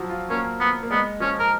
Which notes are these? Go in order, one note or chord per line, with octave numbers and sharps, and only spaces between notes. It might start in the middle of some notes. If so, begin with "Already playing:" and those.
Already playing: F3 F#3
F4
A#3 C#4
B3
A#3
G#3 B3
F3 C#4
A#4